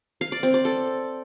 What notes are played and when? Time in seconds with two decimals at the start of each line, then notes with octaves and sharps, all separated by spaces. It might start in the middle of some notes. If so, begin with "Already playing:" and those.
0.21 F5
0.32 D5
0.43 C4
0.54 D5
0.65 A4